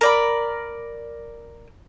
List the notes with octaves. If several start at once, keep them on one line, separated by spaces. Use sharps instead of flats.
A#4 D5 B5